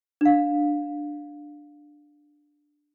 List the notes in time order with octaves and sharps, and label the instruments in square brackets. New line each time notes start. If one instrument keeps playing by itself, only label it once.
[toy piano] D4 F5